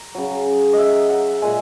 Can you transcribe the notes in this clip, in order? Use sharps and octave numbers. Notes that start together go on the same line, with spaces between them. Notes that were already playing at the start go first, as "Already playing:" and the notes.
Already playing: A#5
C#3 F#3
D#5 E5
F#5
A#2 G#3 G#5